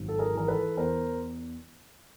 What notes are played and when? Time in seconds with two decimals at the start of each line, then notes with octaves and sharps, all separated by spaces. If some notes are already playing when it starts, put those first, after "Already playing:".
Already playing: G#1 F#3
0.08 A4
0.19 G#4 A#4
0.33 E3 A#4
0.48 A4 B4
0.77 E2 A#4 C5